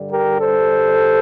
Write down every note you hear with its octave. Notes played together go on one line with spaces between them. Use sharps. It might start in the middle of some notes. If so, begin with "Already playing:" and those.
Already playing: G2 D3 G3
G4 A#4
A4 C5